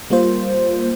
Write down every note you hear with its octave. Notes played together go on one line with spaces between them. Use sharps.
G3 A#3 F4 C5